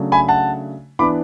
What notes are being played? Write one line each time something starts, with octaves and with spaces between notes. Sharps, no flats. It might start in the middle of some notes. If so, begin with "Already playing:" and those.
Already playing: C#3 F#3 A3 D4
G#5 B5
F#5 A5
E3 B3 D4 B5 D6